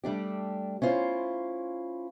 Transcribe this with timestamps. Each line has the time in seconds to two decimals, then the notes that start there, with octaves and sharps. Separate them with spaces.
0.04 G3 A3 D4 G4
0.82 C#4 E4 F4 C5